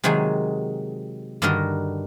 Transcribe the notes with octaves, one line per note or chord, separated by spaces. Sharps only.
C3 D#3 F#3 G#3 F#4 G#4
G2 D3 D#3 F#4 A#4 D#5